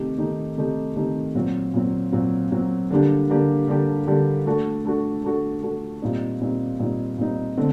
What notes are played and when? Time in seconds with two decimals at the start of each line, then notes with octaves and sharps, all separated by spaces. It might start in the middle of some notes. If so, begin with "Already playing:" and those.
Already playing: C3 D#3 A3 D#4 G4
0.18 C3 D#3 A3 D#4 G4
0.57 C3 D#3 A3 D#4 G4
0.96 C3 D#3 A3 D#4 G4
1.35 A#2 F#3 C4
1.73 A#2 F#3 C4
2.12 A#2 F#3 C4
2.52 A#2 F#3 C4
2.91 D3 G3 A#3 D4 G4
3.29 D3 G3 A#3 D4 G4
3.68 D3 G3 A#3 D4 G4
4.07 D3 G3 A#3 D4 G4
4.46 A3 D4 F#4 A4
4.85 A3 D4 F#4 A4
5.24 A3 D4 F#4 A4
5.62 A3 D4 F#4 A4
6.02 A#2 G3 C4 D#4
6.41 A#2 G3 C4 D#4
6.79 A#2 G3 C4 D#4
7.18 A#2 G3 C4 D#4
7.57 D3 A3 C4